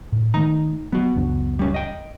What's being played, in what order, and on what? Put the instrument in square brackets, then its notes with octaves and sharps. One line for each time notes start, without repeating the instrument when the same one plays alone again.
[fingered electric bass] A2
[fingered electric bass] D#3 A3 [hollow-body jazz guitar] D#4 A#5
[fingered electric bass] F#3 [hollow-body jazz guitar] B3 F#4
[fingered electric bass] C#2 F#2 D4
[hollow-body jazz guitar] G3 C#4
D#5 G5